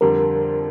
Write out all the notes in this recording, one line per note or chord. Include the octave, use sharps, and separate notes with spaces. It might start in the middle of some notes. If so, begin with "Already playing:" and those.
F2 D3 G3 A#4